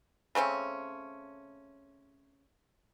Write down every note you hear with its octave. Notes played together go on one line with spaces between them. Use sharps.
C#3 A3 C4 C#4